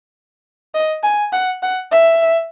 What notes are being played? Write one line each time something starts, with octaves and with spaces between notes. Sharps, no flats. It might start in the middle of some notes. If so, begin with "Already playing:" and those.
D#5
G#5
F#5
F#5
E5